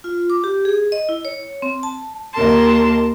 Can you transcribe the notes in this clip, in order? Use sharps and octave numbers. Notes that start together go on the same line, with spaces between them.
F4
D6
G4
G#4
D#5
E4
C#5
C4
A5
D#2 A#4 A5 C6